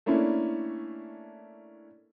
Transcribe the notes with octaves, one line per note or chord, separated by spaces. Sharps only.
A3 A#3 C#4 D4 E4